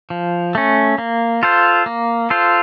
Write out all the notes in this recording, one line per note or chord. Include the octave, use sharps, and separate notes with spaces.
F3
A3 C#4
A#3
F4 A4 C5
A#3
F4 A4 C5